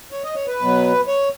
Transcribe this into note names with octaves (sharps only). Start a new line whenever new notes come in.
C#5
D#5
C#5
B4
B2 F#3
C#5